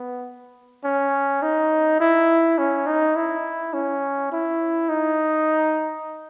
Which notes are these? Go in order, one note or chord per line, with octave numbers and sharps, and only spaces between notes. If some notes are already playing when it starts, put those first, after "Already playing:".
Already playing: B3
C#4
D#4
E4
C#4
D#4
E4
C#4
E4
D#4